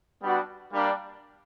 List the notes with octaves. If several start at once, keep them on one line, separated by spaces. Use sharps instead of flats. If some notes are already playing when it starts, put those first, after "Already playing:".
G3 B3 D4 F#4
G3 A#3 D4